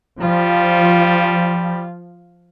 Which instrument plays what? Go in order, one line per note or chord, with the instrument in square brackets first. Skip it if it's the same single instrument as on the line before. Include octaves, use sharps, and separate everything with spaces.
[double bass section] F3 [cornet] G3 [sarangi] F4